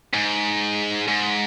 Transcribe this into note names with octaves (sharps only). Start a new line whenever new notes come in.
G#2
G#2